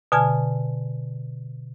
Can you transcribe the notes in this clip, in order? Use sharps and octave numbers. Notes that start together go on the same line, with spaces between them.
B2 D3 G#5 A5 F6 G#6